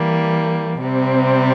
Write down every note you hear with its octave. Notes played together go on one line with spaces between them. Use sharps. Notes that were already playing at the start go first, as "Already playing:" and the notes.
Already playing: E3 G3 A#3
C3 G3 C4